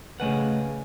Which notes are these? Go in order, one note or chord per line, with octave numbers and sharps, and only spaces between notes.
C#3 A3 B4 D#5 F#5 G#5